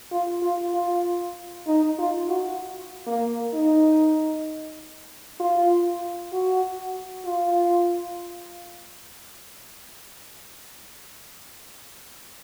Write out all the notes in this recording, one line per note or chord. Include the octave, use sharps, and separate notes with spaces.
F4
F4
F4
D#4
F4
F#4
A#3
D#4
F4
F#4
F4